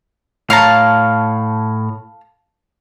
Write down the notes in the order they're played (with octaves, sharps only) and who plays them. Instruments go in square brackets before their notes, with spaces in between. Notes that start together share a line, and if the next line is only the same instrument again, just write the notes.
[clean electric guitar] A2 C#5 A#5 [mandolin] F5 A5